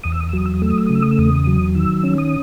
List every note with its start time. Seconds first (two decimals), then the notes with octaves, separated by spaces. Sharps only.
0.04 E2 D#6
0.12 E6
0.20 D#6
0.29 E6
0.33 F#3 D#6
0.46 E6
0.54 D#6
0.62 A3 E6
0.70 D#6
0.78 E6
0.86 D#6
0.90 C#3
0.95 E6
1.02 D#6
1.11 E6
1.18 E2 D#6
1.47 F#3
1.75 D#3 E6
2.04 C#4
2.18 D#6